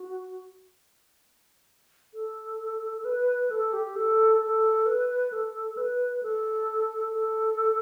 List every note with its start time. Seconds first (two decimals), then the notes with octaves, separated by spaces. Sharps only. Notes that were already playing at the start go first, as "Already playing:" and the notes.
Already playing: F#4
2.14 A4
3.05 B4
3.51 A4
3.73 G4
3.96 A4
4.41 A4
4.86 B4
5.32 A4
5.77 B4
6.23 A4
7.13 A4